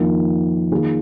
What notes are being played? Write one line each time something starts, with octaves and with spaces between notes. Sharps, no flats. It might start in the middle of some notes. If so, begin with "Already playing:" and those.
Already playing: F2 D#3 A#3 F4
D#3 A#3 F4 G#4